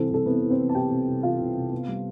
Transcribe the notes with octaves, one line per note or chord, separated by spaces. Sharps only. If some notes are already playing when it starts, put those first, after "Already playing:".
Already playing: C2 E3 C4 A4 C5
C2 A4
C3 B3 B4
C2
C4 C5
E3
A5
C2 G4 G5
C3
C2
E3 F4 F5
C2
C3
B3
G3